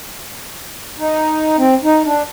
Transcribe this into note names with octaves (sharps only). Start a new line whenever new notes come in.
D#4
C4
D#4
D4